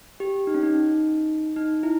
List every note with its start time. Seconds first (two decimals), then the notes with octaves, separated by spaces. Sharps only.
0.20 G4
0.47 D#4
0.54 C#4
0.63 D#4
1.56 D#4
1.83 E4